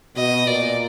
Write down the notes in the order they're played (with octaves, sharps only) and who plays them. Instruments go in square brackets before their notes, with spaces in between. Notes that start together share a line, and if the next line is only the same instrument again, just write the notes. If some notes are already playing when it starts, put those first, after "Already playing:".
[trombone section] B2 [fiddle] D#5
[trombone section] A#2 [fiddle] D5